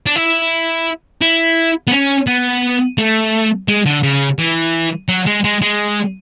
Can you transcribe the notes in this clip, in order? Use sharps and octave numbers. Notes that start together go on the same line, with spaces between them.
D4
E4
E4
B3
C#4
B3
A3
G#3
D3
C#3
E3
F#3
G#3
G#3
G#3